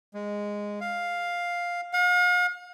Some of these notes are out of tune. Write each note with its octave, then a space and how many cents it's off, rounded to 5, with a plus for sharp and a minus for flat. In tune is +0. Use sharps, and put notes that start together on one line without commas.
G#3 -10
F5 +5
F5 +45